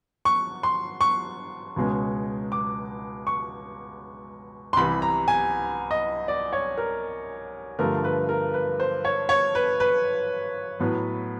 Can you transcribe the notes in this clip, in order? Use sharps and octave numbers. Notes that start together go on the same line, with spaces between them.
C#6
C6
C#6
C#2 B2 G#3 C#4
D6
C#6
C6
C2 C3 E3 B5
A#5
G#5
D#5
D5
C#5
A#4
G2 D3 F3 A3 A#4
B4
A#4
B4
C5
C#5
C#5
B4
B4
A2 F#3 B3